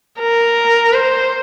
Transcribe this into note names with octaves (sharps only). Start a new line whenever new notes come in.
A#4
C5